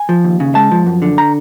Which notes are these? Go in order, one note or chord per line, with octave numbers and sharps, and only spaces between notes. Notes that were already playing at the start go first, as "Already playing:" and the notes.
Already playing: G#5
F3
D#2
C#3
G#3 A5
F3
F#2
D3
A#5